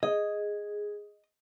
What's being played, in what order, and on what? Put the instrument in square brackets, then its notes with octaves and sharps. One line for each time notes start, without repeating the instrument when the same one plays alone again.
[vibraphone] G#4 [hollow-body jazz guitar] D#5